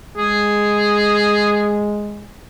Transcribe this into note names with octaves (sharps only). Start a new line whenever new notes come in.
G#3 G#4